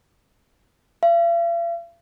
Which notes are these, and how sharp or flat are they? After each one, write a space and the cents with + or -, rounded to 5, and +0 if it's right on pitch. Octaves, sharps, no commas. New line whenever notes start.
F5 -45